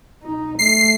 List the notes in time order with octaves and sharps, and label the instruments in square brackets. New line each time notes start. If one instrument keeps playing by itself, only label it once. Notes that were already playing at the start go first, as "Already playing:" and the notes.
[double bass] D#4
[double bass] A3 [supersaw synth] C7